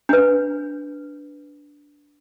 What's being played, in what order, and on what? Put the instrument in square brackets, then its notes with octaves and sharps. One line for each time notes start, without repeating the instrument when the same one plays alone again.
[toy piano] D4 B4